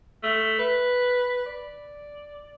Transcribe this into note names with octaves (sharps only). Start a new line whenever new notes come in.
A3
B4
D5